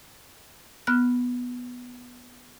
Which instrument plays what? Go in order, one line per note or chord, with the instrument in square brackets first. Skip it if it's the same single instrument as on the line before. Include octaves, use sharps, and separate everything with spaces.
[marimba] B3 F6 F#6